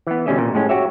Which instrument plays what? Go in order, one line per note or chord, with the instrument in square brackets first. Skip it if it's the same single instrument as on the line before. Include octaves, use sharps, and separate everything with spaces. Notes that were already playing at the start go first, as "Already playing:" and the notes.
[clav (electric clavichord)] E3 B3
B2 D3 G3 C#4 D#5 E5
A#2
A2 G#3 C#4
F#4 G4 C#5 E5